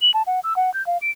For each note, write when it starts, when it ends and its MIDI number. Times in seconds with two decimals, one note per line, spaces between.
0.02 0.11 102
0.14 0.22 81
0.27 0.40 78
0.44 0.56 88
0.56 0.73 78
0.74 0.85 91
0.87 0.98 77
1.02 1.10 98